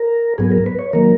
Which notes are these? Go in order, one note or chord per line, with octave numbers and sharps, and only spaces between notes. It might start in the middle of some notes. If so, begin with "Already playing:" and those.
Already playing: A#4
G#2 F#3 B3 G#4
A#4
B4
C#5
D#3 F#3 A#3 A#4